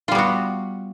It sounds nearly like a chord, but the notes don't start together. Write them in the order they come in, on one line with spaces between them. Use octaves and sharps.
F4 G3 B3 F#4